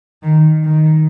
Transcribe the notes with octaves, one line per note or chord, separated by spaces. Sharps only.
D#3
D#3